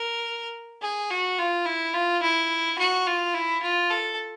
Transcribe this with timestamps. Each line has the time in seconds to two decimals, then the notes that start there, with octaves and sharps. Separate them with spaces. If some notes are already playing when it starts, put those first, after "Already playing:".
Already playing: A#4
0.82 G#4
1.11 F#4
1.39 F4
1.66 E4
1.94 F4
2.23 E4
2.79 F#4
3.07 F4
3.34 E4
3.63 F4
3.90 A4